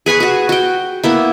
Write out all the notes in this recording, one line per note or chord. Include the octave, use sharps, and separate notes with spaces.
G#4 B4 G#5 C#6
F#4 G#4
F#4 G5
A#3 B3 E4